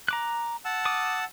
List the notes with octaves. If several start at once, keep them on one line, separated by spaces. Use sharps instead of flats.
A#5 D6 F#6
F#5 A5 E6
D6 D#6